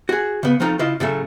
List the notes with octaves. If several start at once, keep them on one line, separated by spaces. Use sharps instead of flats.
F#4 G#4
C#3 B3
F3 A3 C4 D#4 F4
C#3 E4 F4 D#5
A2 C#3 F#3 A3